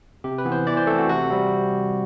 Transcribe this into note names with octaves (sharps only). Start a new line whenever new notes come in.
C3 G4
B4
E3 B3
C5
E3 D5
C5
A3 C4 A4
F#4
C3 F#4
G3 C4